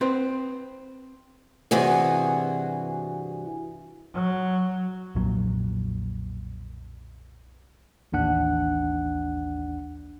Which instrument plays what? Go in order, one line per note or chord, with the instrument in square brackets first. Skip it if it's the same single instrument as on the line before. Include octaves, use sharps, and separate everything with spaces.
[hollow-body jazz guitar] C4 B4 C5
[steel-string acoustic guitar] G2 C3 E3 F#4 G#4
[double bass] F#3
[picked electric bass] B1 F2 A#2 F#3
[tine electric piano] A1 D#2 D4 F#5 F#6